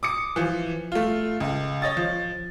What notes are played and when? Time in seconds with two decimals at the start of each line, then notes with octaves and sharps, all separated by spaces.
0.03 D6 D#6 C#7
0.36 E3 F3
0.92 A3 F4
1.40 C#2
1.82 C#5 D#5 A6
1.97 F3